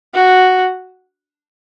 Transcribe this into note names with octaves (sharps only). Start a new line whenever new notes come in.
F#4